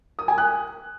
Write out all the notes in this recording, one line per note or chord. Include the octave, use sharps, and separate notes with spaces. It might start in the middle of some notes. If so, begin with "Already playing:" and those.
D#6
G#5
F#6